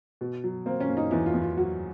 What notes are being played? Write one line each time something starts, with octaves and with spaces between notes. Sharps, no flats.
B2
F#3
A#3 C4
C#4
A#3
D#4
E2 E4
F4
E2
F4
F#3 F#4